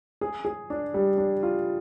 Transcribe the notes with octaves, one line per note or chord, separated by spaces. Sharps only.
G#4
G#4
D4
G3
D4
F4